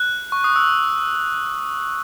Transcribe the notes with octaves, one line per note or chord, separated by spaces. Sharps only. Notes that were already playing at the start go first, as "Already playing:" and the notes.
Already playing: F#6
C#6
D#6
E6